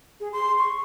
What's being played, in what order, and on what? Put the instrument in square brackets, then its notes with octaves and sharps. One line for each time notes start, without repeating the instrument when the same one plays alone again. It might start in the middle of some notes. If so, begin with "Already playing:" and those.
[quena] G#4
C6
C#6